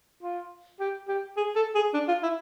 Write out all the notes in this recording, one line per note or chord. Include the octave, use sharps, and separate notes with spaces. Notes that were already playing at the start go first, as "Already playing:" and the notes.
F4
G4
G4
G#4
A4
G#4
D4
F4
E4